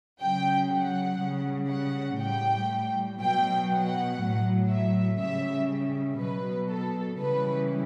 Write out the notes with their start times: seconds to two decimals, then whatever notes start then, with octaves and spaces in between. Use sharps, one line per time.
0.20 C#3 F#3 G5
0.70 F#5
1.20 C#3 G3
1.70 F#5
2.19 A2 G3 G5
3.20 B2 F#3 G5
3.70 F#5
4.20 A2 F#3
4.69 E5
5.19 C#3 G3 E5
6.19 B2 F#3 B4
6.69 A4
7.19 C#3 E3 G3 B4